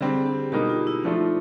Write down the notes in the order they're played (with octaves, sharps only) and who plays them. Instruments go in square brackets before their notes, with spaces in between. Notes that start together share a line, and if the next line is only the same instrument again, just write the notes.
[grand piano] D3 G3 C4 [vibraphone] G#4
[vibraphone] G4
[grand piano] B2 G3 A#3 D#4 [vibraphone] G4
[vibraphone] F4
E4
[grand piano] F3 A3 D4 F4 [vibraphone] D#4